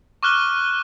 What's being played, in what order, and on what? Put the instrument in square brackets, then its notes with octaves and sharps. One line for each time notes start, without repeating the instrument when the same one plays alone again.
[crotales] C#6 D6 F6 F#6 D#7 G7